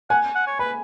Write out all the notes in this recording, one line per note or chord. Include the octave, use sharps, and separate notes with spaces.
F#5 G#5
F#5
C#5
B4 B5